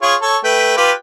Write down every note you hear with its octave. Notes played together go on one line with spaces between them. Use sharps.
F4 G#4 C#5
A4 C#5
A3 B4 G5
F4 G4 B4